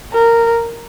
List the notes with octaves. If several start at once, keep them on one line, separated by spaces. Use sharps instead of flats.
A#4